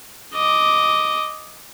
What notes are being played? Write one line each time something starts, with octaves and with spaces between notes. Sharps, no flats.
D#5 D6